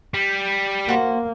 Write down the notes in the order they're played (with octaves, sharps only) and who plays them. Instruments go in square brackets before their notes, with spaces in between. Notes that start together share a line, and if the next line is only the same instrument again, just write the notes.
[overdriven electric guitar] G3
[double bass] A#3 [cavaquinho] F#4 C5